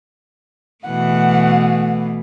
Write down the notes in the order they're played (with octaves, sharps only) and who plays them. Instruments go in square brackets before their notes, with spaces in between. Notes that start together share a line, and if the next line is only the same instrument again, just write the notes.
[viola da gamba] B2 E3 A3 [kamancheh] F#5